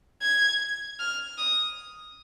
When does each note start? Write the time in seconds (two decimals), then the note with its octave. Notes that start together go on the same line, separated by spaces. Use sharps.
0.22 G#6
0.99 F6
1.38 D#6